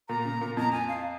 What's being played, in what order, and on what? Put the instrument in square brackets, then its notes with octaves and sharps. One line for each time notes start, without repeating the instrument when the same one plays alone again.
[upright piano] A#2 [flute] A#5
[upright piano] C#3
A#2
[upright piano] F2 [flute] A#5
[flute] G#5
F5